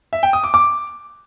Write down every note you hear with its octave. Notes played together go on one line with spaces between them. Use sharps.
E5
G5
D#6
D6
D6